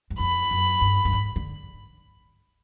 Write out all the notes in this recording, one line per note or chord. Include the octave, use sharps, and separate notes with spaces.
F#2
F2 B5
F#2
G2
G2
G#2
D3